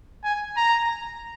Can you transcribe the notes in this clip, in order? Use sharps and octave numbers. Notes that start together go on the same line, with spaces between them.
G#5
A#5